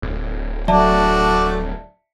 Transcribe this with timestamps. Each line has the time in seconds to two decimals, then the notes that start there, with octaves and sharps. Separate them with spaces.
0.02 D1
0.68 F#3 A3 D4 F#4 D5 E5 A5